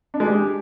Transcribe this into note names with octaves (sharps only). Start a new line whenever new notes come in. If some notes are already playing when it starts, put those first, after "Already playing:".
D4
G#3
G4